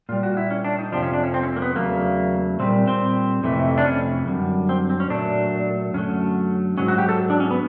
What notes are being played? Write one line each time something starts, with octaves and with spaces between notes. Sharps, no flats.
A#2 G3 F4
F#4
E4
C#4
D4
D#4
F2 C3 F3 D4
C#4
D4
C#4
C4
C#4
C4
A#3
B3
E2 C#3 F#3 A3 A#3
A#2 G3 C4
C4
F2 C3 E3 A3
D4
C#4
F#2 D3 G3
C4
C4
C#4
A#2 F#3 A3 D4
F#2 D3 F#3 A3 C#4
G#2 D#3 F#3 C#4
F#4
G4
A4
D4
C#4
B3